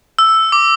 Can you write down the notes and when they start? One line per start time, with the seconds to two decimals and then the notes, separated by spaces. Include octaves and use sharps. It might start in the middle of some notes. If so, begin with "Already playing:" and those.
0.19 E6
0.52 D6